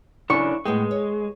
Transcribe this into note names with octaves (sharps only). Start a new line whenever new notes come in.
C#3 E3 F#3 D4 A4 C#6
A2 G#3 B3 G5
C#5